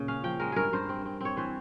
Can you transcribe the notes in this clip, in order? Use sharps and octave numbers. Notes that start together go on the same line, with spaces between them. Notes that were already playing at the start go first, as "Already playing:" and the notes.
Already playing: A#2 C#3
C#4 F5
F3 G5
G#3 A#4
G2 G#4 A#4
G2 C5
C4
C4
C4 C#5
E3 C5